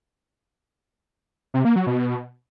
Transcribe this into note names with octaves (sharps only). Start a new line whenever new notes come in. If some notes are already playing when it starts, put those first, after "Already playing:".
C3
A#3
F#3
B2